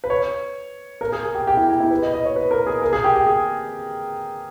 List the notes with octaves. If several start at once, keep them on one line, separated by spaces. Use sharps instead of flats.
B4
C#5
A#4
G#4
G#4
G4
G4
E4
G4
E4
B4
D#5
D#5
C#5
B4
A#4
G#4
A#4
G#4
G4
G4
G#4